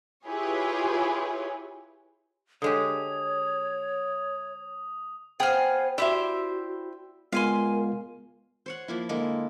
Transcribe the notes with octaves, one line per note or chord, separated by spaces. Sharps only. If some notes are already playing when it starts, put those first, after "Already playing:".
E4 F4 G4 G#4 B4 C#5
D3 G#3 G4 C#5 D#6
B3 G#4 C5 F5 G5
E4 F#4 G4 C5 D5 E5
G#3 B3 F4 A#4 F5 G#5 C6
C5 C#5 F#5
F3 A#3 E4
D3 G#3 A#3 E4